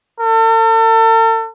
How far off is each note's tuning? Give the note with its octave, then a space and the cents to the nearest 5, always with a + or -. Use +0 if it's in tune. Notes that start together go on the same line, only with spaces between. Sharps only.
A4 +40